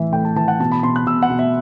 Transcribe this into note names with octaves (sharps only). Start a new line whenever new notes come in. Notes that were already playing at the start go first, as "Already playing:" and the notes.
Already playing: A2 E3 E5
A2 G5
A5
E3 A5
F#5
B2 A5
B5
B2 C6
F#6
B2 E6
F#5
B2
E5